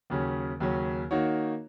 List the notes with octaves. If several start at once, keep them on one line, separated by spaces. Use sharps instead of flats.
D#2 C#3 F#3 C#4
D#2 C#3 F#3 C#4
D#3 A#3 D#4 F#4 C#5